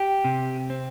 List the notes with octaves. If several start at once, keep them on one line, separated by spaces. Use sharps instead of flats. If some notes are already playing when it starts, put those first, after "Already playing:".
Already playing: G4
C3
C4